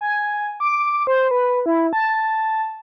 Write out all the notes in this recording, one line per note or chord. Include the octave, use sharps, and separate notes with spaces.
G#5
D6
C5
B4
E4
A5